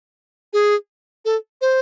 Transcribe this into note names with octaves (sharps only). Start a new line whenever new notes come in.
G#4
A4
C5